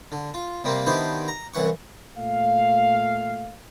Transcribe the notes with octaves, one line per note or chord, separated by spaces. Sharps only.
D3
F4
C3 G3 A#3 C4
D#3 B3 D4 E4 G4 C5
A#5
C2 F#2 E3 F#5 C#6
A#2 A3 F5